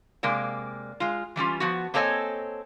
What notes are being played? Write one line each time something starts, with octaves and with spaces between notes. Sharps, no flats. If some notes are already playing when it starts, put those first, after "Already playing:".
C3 G#3 A#3 D5
G#3 F4
E3 G3 C#4 F4
F3 B3 F#4
A#3 C4 A4 C#5 D#5 G#5